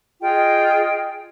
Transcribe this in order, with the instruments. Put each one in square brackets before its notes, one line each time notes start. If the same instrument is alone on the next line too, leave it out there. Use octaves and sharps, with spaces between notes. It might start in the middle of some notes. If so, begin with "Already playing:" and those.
[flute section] F4 G#4 D#5 G5